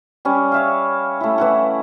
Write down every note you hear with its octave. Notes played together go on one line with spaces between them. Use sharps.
G3 C#4
C#5 E5 F5
A3 E4
E3 E4 F#5